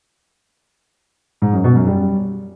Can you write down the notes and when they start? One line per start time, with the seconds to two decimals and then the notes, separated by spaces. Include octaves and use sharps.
1.42 G#2
1.53 F#2
1.64 B2
1.75 F#2
1.87 G3